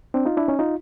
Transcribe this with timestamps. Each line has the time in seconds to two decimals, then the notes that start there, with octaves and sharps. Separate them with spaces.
0.14 C4 D4
0.26 D#4 F4
0.37 D4 E4
0.48 C#4 D#4
0.59 D#4 F4